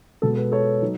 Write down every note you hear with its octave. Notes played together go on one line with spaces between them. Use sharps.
B2 G#3 B3 A4
B4
A4 C#5
F#3 D#4